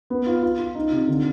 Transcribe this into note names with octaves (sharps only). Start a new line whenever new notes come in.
B3
F4
F4
F4
D#4
C3
D3